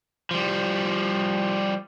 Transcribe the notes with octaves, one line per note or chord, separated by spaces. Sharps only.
F3 G3